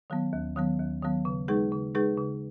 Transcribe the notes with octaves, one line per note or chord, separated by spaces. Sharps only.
D#3 F#3 B3
D#2
D#3 F#3 B3
D#2
D#3 F#3 B3
C#3
G#3 D#4 G#4 B4
C#3
G#3 D#4 G#4 B4
C#3